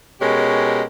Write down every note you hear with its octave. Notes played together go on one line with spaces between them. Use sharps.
B2 G#3 C#4 G4 A#4